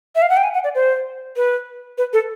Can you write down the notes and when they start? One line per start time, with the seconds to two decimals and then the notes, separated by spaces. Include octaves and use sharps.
0.15 E5
0.22 F5
0.30 F#5
0.37 G5
0.44 G#5
0.54 F#5
0.64 D5
0.75 C5
1.36 B4
1.98 B4
2.13 A4